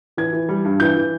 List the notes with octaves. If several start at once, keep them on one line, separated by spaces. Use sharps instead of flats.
E3 G#6
E3
G3
G2
E3 G6
E3